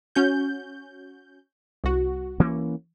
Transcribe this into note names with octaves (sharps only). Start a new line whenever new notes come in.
C#4 F#4 G6
C2 F#4
E3 A#3 C#4